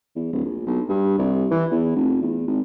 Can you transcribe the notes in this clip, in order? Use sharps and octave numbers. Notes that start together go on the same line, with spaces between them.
E2
D1
A#1
B1
G2
C2
E3
E2
F1
E2
G#1